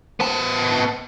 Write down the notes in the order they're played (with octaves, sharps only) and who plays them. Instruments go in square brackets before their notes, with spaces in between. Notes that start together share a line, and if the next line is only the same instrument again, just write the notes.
[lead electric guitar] B3 A5